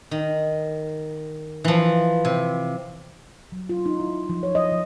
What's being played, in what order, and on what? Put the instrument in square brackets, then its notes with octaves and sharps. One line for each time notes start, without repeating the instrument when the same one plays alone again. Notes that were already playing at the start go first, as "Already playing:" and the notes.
[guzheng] D#3
E3 F3
C3
[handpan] F#3
F4
D#4
E4
F3
C#5
D#5
F3